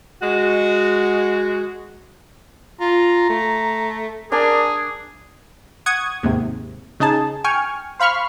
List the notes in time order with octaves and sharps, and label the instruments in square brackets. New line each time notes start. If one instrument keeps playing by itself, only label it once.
[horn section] G#3 F#4
[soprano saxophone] F4 [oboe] A#5
[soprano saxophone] A3
[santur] D4 D5 G#5 [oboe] G#4 [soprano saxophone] A#4
[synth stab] F#5 C#6 D#6 G#6 D#7
D#2 G#2 C3
C#3 D#4 G#4 A5
G5 G#5 C#6 F6
C5 F5 B5 C#6 F6